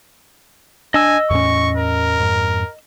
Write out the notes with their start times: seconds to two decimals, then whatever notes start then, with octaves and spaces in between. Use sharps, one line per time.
0.94 D4 D#5 G#5 E6
1.30 E2 A2 C#4 C#6
1.77 A#4
2.20 F2 G#2